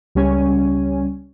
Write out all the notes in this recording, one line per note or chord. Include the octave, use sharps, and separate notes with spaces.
C#2 G3 C#4 G#5